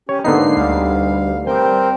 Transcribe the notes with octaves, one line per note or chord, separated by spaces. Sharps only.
C#4 G4 C#5
G#2 D3 A#3 B3 D#4 C7
D2 G3 F5
G3 C4 A#4 C5 G5